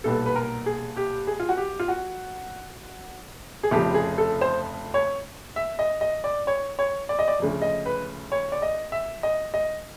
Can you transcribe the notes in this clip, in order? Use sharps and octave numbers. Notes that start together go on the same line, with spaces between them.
B1 A#2 G3 B3 A4
B4
A#4
G#4
G4
G#4
F4
F#4
G4
F4
F#4
G#4
F1 F2 C#3 F3 G4
G#4
A4
C5
C#5
E5
D#5
D#5
D5
C#5
C#5
D5
D#5
D5
D2 C#3 F3
D#5
B4
C#5
D5
D#5
E5
D#5
D#5